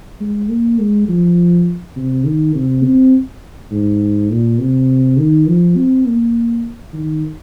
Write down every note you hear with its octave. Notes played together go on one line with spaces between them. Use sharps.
G#3
A#3
G#3
F3
C3
D#3
C3
C4
G#2
A#2
C3
D#3
F3
C4
A#3
D#3